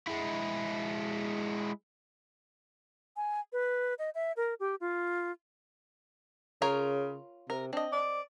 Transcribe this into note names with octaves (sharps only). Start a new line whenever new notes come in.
G#3 E4
G#5
B4
D#5
E5
A#4
G4
F4
C#3 F4 A#4 C#5
C3 A#4
C4 D4 D#5
D5